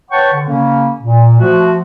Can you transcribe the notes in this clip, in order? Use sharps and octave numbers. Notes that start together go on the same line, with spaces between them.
B4 C#5 F#5 G5 A5 C#6
D3
C#3 A#3 C#4
A#2
F3 A3 F#4